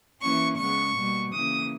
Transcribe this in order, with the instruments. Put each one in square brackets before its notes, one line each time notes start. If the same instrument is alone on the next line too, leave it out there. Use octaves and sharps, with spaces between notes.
[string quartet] E3 A#3 C#4 C#6
C#3 G#3 B3 C#6
B2 G3 A#3
C#3 E3 A#3 D#6